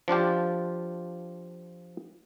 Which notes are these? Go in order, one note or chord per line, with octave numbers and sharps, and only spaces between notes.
F3 D4 F4 G4